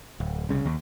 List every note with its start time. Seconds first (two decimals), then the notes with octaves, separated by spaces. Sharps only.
0.20 D1
0.49 C2 C#3
0.65 D#2